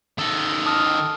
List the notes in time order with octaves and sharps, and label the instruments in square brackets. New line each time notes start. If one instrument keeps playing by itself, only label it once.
[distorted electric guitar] D#3 A4
[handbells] A5 D#6 F6